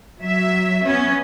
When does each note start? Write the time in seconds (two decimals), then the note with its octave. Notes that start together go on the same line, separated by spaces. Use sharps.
0.21 F#3 E5
0.87 B3 C#4